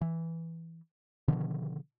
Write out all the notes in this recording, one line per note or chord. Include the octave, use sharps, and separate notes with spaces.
E3
B2 D3 D#3 F3